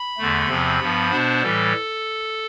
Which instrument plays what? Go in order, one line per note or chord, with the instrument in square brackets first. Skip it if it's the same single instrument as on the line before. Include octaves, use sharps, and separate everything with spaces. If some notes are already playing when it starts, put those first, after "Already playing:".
Already playing: [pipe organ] B5
E2 D3 A3
E2 C3 F3 C4
G2 F3 B3
B2 B3 D4 C5
A2 E3 G3 A4